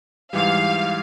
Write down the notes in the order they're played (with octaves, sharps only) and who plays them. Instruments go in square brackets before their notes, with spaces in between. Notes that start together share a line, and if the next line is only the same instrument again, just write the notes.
[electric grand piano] G#2 E3 G3 [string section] F5